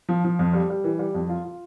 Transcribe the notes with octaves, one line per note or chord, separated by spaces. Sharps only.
F3
F3
F2
G3
G3
E3
G3
F2
F4
F4